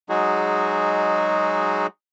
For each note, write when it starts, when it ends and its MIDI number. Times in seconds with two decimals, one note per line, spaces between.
0.09 1.87 54
0.09 1.87 56
0.09 1.87 63
0.09 1.87 66
0.09 1.87 68